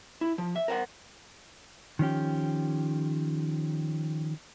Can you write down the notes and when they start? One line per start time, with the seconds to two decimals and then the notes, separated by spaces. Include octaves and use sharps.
0.21 E4
0.38 F3
0.56 E5
0.68 A#4 C5 F5 F#5
1.99 D#3 F3 C#4 G4